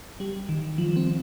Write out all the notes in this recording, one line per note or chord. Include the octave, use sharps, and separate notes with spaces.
G3
D#3
F3
C4